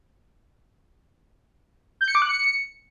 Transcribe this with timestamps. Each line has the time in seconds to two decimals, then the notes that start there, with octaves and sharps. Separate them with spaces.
2.01 G6
2.08 C#7
2.15 D6
2.22 F#6
2.29 C#7